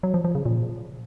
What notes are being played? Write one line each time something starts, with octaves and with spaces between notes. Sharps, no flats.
F#3
F3
F3
C#3
A#2